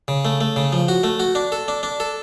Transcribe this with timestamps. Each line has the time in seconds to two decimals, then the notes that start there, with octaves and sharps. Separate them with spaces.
0.08 C#3
0.25 A3
0.41 A3
0.56 C#3
0.73 F3
0.88 F#4
1.04 A3
1.20 F#4
1.35 D4
1.52 A4
1.68 D4
1.83 D4
2.00 A4